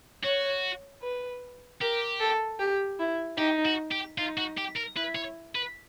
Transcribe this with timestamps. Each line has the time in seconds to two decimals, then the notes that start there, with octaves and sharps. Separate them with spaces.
0.24 F#4 C#5
1.03 B4
1.81 G4 A#4
2.20 A4
2.60 G4
2.99 E4
3.38 D#4 G4
3.65 F#4
3.91 G4
4.18 D#4 F4
4.37 F#4
4.57 G4
4.76 A#4
4.96 E4 B4
5.15 C#5
5.55 B4